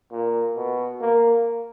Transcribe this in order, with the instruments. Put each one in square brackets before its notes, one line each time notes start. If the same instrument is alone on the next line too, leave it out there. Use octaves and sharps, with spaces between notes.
[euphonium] A#2
B2
A#3